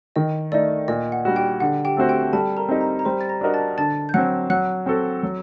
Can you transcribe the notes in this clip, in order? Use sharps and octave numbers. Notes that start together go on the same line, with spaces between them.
D#3 D#5
A3 D#4 D5
A#2 D#5
F#5
G3 D4 F#4
G4 G5
D3 F#5
G4 G5
A3 C4 F#4 C5
G4 G5
G3 A4 A5
A#4 A#5
C4 D#4 G4
A#4 A#5
A#5
G3 C5 C6
A6
A#5 A#6
D4 F#4 A#4 D#5
A5 A6
D3 A5 A6
G6
F#3 C4 F#5 F#6
F#3 F#5 F#6
C4 F#4 A4
F#3